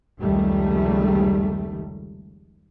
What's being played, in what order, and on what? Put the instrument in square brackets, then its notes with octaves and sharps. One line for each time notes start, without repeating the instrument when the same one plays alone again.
[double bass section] F1 C#2 D#3 G3 A3